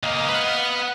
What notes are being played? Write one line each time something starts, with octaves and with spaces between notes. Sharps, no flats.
C#2 A#3 D#5 F5
B4 F#5